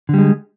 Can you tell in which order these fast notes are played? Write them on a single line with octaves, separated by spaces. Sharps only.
D3 G3 G#3